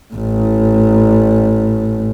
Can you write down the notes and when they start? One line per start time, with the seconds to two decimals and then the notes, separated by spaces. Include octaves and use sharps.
0.14 A1 A2